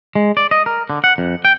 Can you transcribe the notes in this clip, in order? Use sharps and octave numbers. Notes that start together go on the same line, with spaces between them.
G#3
D5
D#5
A#4
D3
F#5
F2
G5